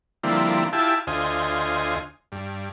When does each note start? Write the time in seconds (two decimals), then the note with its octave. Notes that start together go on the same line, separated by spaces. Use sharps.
0.23 D3 F3 G3 A#3 C4 E4
0.73 E4 F4 G4 G#5 A5 E6
1.07 D2 F4 C5 D#5 G#5
2.32 G2